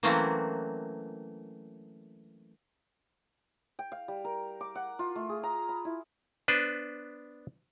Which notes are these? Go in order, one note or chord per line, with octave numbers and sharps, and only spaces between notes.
E3 F#3 A3 A#3 C4 C#4
G5
F5
G3
A#4
D6
F#5
F4
A3
G#4
A#5
B5
E4
B3 D4 B4 C5